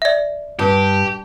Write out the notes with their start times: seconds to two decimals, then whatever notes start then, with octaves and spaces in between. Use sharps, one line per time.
0.02 D5 E5
0.59 G2 G4